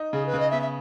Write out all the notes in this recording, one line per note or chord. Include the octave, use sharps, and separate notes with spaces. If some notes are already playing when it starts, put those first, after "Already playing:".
Already playing: D#4
C#3 G#4
B4
C#3
D#5
B3 E5
E5